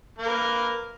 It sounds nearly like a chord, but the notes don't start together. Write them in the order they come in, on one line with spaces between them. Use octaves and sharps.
A#3 A#4 B4